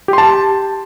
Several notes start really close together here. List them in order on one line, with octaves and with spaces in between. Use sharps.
G4 C6 A5